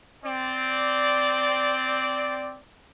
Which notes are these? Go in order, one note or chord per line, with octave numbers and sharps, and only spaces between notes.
C4 D5